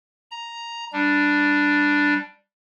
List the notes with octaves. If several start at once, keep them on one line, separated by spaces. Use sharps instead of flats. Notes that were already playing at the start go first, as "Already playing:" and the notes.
A#5
G3 D4